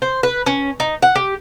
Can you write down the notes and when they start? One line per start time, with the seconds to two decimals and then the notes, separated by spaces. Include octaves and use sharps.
0.02 C5
0.23 B4
0.46 C#4
0.80 D#4
1.02 F#5
1.16 G4